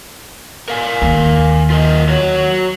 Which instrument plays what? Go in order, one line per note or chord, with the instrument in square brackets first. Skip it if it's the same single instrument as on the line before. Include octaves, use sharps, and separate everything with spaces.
[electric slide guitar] A#4 F5 G#5
[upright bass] D#2
[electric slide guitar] F4 A#4 D#5
F#3 F#4 C#5